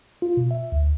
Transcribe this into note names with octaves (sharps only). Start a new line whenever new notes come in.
F4
B2
E5
D2